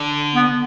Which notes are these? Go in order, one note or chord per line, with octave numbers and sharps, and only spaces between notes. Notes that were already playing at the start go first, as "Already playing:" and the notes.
Already playing: D3
B3